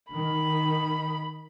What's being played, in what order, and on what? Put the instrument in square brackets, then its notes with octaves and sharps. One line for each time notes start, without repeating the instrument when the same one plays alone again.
[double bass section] D#3 [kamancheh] B5